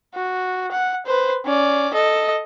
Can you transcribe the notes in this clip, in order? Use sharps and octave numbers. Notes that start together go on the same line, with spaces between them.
F#4
F#5
B4 C5
C#4 D5
A4 D#5